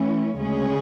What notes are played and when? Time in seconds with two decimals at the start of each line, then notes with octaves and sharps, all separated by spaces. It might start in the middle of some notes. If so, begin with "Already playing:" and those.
Already playing: E3 A3 C#4
0.36 D2 C#3 G#3 C#4 G#4